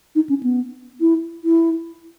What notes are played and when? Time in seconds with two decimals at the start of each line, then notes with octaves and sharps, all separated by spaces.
0.15 D#4
0.29 C#4
0.43 B3
1.01 E4
1.44 E4